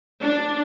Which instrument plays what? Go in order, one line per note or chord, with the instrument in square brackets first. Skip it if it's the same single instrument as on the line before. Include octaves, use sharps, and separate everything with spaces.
[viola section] D4